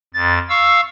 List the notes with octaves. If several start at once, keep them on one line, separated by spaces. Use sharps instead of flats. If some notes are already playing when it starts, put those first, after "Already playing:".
F2 A6
F5 C#6 E6